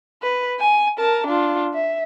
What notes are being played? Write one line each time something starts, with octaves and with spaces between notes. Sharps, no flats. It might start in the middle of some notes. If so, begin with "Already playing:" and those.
B4
G#5
A#4 A5
D4 F4
E5